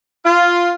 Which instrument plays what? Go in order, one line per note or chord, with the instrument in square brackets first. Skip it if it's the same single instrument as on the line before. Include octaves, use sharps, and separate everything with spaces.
[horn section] F4